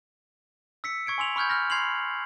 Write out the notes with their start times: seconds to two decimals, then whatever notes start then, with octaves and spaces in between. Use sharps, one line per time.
0.84 E6 B6 C#7
1.06 C#6 G#6 C#7 D7
1.18 G#5 C6 E6 F7 F#7
1.36 B5 C#6 F6 G6 G#6
1.50 F6 F#6 A#6
1.70 B5 C6 G#6 C7 F7 F#7